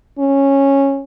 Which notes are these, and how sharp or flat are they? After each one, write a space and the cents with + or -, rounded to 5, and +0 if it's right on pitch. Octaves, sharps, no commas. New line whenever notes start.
C#4 -10